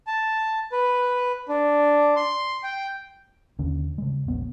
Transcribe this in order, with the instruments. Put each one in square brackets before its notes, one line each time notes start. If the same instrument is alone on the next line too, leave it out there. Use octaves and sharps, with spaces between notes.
[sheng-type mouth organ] A5
B4
D4
C6
G5
[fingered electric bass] D#2 D3 C#4
C#3 G#3
E1 A#1 B3